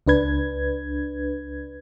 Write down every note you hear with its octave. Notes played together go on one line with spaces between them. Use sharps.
C#2 D4 B4 G#6